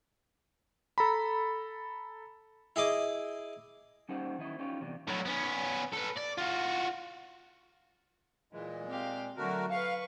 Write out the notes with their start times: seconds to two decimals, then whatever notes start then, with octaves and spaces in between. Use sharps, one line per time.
0.98 A4 A#5 B5
2.76 E4 G#4 D#5 D6
4.09 G3 C#4 D#4 G4 C5 F#5
4.38 D#3 C#4 E4 D#5
4.59 C#4 D#4 F4 G4 C#5
4.80 E2 C3 D4
5.08 A2 F#3
5.25 B3 C#4
5.93 A4 B4
6.17 D5
6.38 F4 F#4
8.53 A#2 E3 G#3
8.87 C4 G4 F5
9.37 D3 F#3 A3 F#4 A#4
9.70 B4 F5 C#6